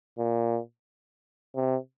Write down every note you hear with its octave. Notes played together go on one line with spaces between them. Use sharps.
A#2
C3